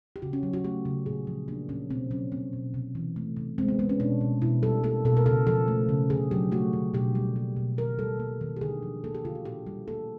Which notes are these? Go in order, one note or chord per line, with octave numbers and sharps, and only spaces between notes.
G4
C#3 F#4
C#4
F#3
F#4
A3 G4
C#3
A#2 G#4
F3
A#3 D4
A#2 C#4
B2 C4
F#3 C#4
A#3 C4
B2
C3
E3
A3
C3
G#3 C4
B3
G#3 B3
C#4
B2 D4
B2
B2 E4
G3 A4
A#3 A4
B2 A4
A#4
C#3 A4
F3 A4
A3
C#3
D3 G#4
F#3 G4
A3 F#4
D3
B2 G4
G3
A#3
B2
D#3 A#4
G3 A4
A#3
D#3
G4
D3 G#4
F3
A#3 A4
G4
D3 F4
F#4
A#2 G4
G3
A#3 A4